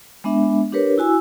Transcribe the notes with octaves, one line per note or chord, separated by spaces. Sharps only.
G#3 B3 D4 E5
D4 G4 A#4 B4 C#5
E4 F#4 G#5 E6